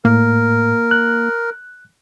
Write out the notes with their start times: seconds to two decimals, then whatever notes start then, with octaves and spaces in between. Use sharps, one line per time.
0.05 A2 A#3 A#4
0.91 F#6